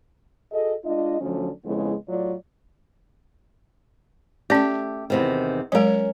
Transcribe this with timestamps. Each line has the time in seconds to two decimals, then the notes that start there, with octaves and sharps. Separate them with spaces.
0.52 F#4 G#4 A4 D#5
0.85 G#3 D4 F4 D#5
1.21 D3 F3 F#3 A3 C#4 D4
1.65 F2 C#3 G#3 B3 E4
2.08 A2 F#3 F4 D5
4.50 A3 C#4 G4 D5
5.10 E2 C3 D#3
5.72 F#3 G#3 C#4 A#4